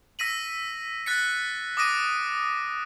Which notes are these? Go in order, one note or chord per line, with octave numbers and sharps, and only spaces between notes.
E6 A#6 B6 D#7 F#7
F#6 A6 B6 C#7
D6 D#6 A#6 D7 D#7